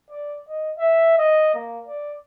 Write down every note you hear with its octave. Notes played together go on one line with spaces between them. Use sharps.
D5
D#5
E5
D#5
A#3
D5